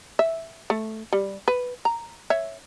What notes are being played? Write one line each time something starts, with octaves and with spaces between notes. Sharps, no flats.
E5
A3
G3
B4
A#5
C#5 E5